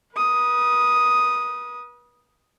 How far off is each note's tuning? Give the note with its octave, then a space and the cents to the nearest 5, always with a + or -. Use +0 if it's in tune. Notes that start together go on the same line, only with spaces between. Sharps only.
B4 -35 D#6 +0